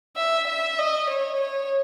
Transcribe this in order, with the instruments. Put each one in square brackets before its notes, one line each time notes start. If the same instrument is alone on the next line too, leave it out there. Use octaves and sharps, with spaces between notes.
[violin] E5
E5
D#5
C#5
C#5